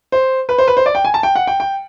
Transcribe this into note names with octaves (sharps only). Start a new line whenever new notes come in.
C5
B4
C5
B4
C5
D5
G5
G#5
A5
G5
F#5
G5
G5